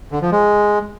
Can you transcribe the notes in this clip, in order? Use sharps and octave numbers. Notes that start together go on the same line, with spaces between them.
D3
F3
G#3